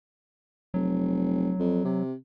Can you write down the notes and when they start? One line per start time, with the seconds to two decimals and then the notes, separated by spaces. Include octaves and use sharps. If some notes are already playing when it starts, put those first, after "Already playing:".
0.74 F1 F#3
1.59 F2
1.84 C3